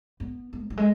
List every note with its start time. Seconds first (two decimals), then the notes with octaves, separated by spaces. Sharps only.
0.20 B3
0.53 B3
0.63 F3
0.70 F#3
0.77 G#3